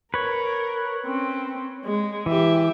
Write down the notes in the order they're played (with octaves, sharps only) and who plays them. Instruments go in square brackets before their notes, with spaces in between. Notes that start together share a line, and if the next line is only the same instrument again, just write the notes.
[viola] A#4 [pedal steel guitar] B4 C#5
[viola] C4 C#4
G#3
[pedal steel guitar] E3 [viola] G4 E5